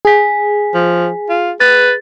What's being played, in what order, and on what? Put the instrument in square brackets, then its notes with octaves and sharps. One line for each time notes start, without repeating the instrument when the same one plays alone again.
[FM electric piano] G#4 [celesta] G#5 B6
[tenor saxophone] F3
F4
[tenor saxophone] B4 [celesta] A6